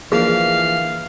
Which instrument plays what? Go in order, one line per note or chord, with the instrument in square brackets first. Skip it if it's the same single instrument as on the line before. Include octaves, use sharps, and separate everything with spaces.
[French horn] E3 [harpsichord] F3 A#3 D4 [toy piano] G#4 [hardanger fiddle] F5